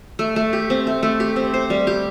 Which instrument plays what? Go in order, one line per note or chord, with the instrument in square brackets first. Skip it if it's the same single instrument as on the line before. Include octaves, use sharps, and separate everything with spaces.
[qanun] A3
A3
G4
C4
A3
A3
G4
C4
C5
G3
G4